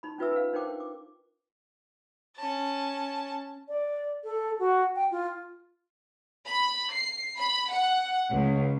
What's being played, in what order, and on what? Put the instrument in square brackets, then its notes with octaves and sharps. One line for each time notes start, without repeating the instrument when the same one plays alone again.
[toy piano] D#4 B5
C#4 D#4 F4 B4 E5 E6
B4 F5
D4 D#4 A#4 C5 G5 D6
D6
[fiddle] C#4 A5
[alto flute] D5
A4
F#4
G5
F4
[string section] B5
C7
B5
F#5
C#2